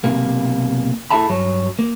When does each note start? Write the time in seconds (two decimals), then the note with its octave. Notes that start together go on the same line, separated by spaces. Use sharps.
0.04 B1 C3 A#3
1.11 E4 G#4 A4 E5 A5 B5
1.29 G2 F#3 C#5
1.79 A#3